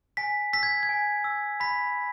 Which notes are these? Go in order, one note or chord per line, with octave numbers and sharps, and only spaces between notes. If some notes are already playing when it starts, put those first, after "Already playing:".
G#5 B6
E6 B6
G#6
G#6
G#5
E6
B5 B6